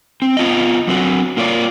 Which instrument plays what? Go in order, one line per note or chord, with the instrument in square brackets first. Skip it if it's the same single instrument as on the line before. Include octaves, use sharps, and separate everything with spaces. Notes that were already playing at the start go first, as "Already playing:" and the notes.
[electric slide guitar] C4
B3 F4 D#5
F#3 C4 F#4
A#3 F4 C#5 D5